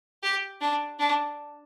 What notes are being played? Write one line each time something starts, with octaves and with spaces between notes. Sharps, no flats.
G4
D4
D4